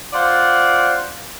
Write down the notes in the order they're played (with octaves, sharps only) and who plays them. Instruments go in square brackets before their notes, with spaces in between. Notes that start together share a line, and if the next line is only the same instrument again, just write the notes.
[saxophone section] F4 C5 D5 F#5